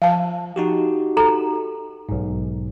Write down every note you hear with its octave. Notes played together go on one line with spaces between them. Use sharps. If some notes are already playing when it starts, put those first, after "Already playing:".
F3 F5 A5
D#4 F#4 G4
A4 A#5
B1 G#2